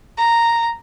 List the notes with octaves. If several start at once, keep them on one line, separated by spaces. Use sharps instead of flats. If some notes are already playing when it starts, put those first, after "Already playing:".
A#5